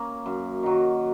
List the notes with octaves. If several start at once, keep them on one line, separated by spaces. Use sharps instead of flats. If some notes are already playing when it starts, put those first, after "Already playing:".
Already playing: A#3 C#4
F#2
D#3 F#3